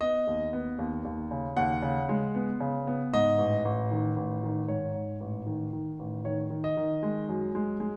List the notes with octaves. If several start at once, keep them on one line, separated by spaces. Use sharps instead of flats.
B3 D#5
D#2
B3
D#2
D#2
C#3
D#2 F#5
C#3
G#3
B3
C#3
B3
G#2 D#5
A1
A1
D#3
A1
D#3
G#2 C#5
G#2
A1
D#3
D#3
A1
D#3 C#5
D#3
D#5
D#3
G#3
F#2
G#3
G#3